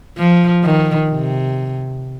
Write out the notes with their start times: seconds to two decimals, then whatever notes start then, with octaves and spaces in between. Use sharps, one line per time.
0.18 F3
0.64 D#3
1.09 C3